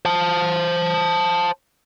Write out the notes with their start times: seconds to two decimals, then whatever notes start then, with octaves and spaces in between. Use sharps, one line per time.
0.06 C5 A5